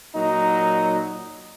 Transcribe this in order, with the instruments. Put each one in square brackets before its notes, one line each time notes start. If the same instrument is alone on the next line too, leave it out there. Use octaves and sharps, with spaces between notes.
[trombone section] A#2 F#3 D#4